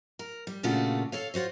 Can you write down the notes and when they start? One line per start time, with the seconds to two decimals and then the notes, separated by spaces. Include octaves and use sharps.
0.19 A#4
0.47 G3
0.63 A#2 C#3 A3 D4 F4 F#4
1.12 A4 C#5 F5
1.34 F4 F#4 C5 C#5